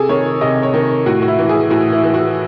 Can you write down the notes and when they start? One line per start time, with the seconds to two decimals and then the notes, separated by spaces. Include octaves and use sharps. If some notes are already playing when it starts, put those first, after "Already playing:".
Already playing: C3 G#4 A4
0.09 D#3 C#5
0.41 C3 D#5
0.63 C#5
0.74 D#3
1.06 A2 F#4
1.22 F#4
1.28 E4
1.39 E3
1.49 G#4
1.70 A2 F#4
1.92 E4
2.04 E3
2.14 F#4